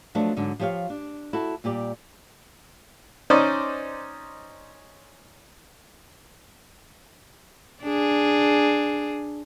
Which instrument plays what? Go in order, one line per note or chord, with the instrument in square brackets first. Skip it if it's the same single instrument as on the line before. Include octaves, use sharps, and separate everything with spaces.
[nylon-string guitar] F3 F#3 A3 D4 F4
G#2 D3 F#3
F3 G4 C#5 D#5 F5
D4
E4 F#4 A4
A#2 G3 G4 D5
[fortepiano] C#4 D#4 C5 D5 D#5
[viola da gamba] D4 G#4